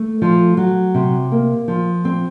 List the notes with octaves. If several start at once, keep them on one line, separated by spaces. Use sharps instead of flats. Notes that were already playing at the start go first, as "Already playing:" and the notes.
Already playing: A3
F3
F#3
C3
A#3
F3
C4